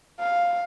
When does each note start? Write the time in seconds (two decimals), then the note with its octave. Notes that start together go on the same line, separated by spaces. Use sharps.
0.20 F5